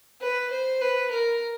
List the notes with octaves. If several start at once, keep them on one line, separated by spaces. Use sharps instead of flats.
B4
C5
B4
A#4